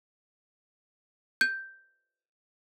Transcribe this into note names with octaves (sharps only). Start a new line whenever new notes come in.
G6